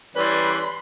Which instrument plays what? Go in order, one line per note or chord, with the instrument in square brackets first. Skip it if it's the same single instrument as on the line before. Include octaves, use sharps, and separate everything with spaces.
[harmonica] E3 G3 C#4 [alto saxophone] B4 [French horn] D5 [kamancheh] B5 C6